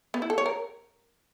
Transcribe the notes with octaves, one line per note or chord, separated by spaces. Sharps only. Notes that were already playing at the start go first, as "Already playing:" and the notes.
B3
E4
A4
C#5
A#4